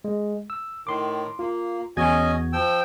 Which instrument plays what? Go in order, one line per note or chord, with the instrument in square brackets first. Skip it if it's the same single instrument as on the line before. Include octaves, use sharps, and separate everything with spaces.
[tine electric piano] G#3
E6
[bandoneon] A2 D#3 [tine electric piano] C6 D6
[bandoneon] A#3 [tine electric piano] F4
[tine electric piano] E2 F#4 G#6 [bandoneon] C#4 D#5 G#5
[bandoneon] F3 G5 E6